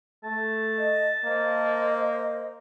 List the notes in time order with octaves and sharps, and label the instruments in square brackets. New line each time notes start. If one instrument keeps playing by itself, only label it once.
[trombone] A3 [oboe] A5
[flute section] D#5
[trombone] A#3 [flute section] C5 D#5